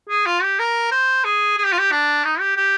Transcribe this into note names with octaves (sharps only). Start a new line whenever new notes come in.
G#4
F4
G4
A#4
C5
G#4
G#4
G4
F4
G4
D4
D#4
G4
G4